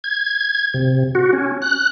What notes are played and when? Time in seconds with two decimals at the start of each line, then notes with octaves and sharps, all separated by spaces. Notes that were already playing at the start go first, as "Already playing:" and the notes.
0.04 G#6
0.74 C3
1.15 F#4
1.33 C#4
1.62 F#6